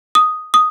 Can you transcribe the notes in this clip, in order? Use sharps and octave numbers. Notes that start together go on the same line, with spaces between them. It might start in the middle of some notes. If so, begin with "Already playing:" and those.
D#6
D#6